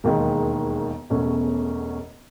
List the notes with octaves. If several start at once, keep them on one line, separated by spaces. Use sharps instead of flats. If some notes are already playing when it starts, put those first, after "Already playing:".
E1 D#2 D#3 G#3
E1 E2 B2 A3 C#4